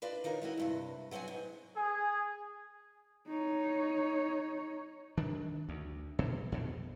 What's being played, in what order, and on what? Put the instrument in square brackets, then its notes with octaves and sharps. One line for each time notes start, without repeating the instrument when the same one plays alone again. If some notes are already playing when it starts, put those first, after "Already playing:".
[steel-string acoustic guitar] D4 F4 B4 C5 D5 D#5
D#3 D#4 F4 A#4 C#5
G#3 E4 F#4 D#5
E2 G2 C3
F#3 B3 C4 F#4 G#5
G#2
[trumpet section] G#4 G#5
[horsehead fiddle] D#4 C#5
[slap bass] D#3 D4
D2
B2
F2 B2